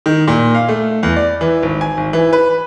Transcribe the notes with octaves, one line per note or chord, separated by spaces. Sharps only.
D#3
A#2
F5
A3
E2
D5
E3
G#1
G#5
G#1
E3
B4